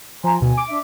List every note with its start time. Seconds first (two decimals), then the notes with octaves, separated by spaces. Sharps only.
0.24 F3 G#5 A#5 C6
0.40 D2 B2 G#5
0.57 D6
0.69 D4 E5